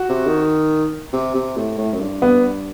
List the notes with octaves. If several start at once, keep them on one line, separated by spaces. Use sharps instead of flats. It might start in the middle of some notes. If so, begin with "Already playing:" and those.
Already playing: F#4
C3
D#3
C3
C3
A2
A2
F#2
G2
B3